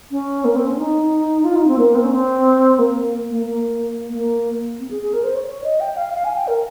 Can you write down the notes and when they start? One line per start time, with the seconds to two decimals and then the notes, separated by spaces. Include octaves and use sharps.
0.11 C#4
0.45 A#3
0.56 C4
0.67 C#4
0.78 D#4
1.44 F4
1.56 D#4
1.67 C4
1.78 A#3
1.95 C4
2.04 C#4
2.12 C4
2.79 A#3
3.30 A#3
3.46 A#3
4.13 A#3
4.80 C4
4.91 G#4
5.02 G#4
5.13 A#4
5.24 C5
5.35 C#5
5.47 C#5
5.64 D#5
5.80 G5
5.97 F5
6.14 F5
6.25 G#5
6.36 G5
6.47 A#4